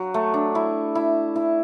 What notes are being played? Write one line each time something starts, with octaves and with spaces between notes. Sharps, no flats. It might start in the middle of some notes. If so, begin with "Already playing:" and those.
Already playing: F#3
A3
D4
E4
E4
E4